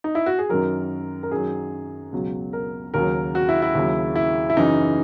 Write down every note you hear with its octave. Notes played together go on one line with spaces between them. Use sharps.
D#4
E4
F#4
G#4
F#2 D#3 F#3 A#4
A#4
F#2 D#3 F#3 G#4
C#2 B2 F#3
A#4
D#2 C#3 F#3 A#4
F#4
E4
E4
D#2 C#3 F#3
E4
E4
F#2 C#3 E3 D#4